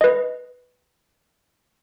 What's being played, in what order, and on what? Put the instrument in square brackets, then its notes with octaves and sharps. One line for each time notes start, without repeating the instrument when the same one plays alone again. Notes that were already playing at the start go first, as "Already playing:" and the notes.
[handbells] B4 D#5